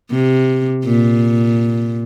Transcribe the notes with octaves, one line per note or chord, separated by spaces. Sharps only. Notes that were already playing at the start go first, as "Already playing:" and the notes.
C3
A#2